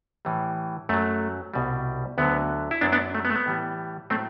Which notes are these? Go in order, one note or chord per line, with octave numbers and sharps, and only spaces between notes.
A2 E3 G3
F#2 F#3 A3
C2 B2 G3
D2 D3 F#3 B3
E4
F#2 F#3 B3 D4
B3 D4
A3
B3
A3
B3
A2 E3 G3
A2 F#3 A3 C4